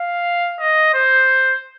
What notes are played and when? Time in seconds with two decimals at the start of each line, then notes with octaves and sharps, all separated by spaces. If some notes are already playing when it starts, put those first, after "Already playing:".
Already playing: F5
0.59 D#5
0.94 C5